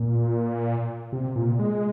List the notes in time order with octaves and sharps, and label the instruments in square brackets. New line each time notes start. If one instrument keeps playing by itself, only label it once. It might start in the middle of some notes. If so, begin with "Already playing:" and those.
Already playing: [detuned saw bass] A#2
C3
A#2
G#3